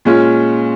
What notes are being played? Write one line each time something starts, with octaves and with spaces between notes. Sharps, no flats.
A#2 G#3 C#4 F4